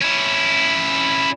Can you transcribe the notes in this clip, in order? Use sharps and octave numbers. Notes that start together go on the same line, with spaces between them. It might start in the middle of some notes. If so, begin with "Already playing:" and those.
C#4 E4